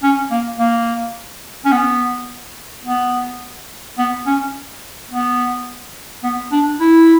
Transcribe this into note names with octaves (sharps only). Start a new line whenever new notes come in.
C#4
A#3
A#3
C#4
B3
B3
B3
C#4
B3
B3
D4
E4